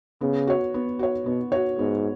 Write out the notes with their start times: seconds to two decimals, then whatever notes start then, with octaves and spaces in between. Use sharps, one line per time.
0.21 C#3 B3
0.47 F#4 C#5
0.74 B3
0.99 F#4 C#5
1.26 B2 B3
1.52 F#4 C#5
1.78 G#2 B3